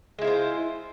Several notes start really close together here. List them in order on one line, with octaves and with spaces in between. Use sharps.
G#3 E4 F4 C5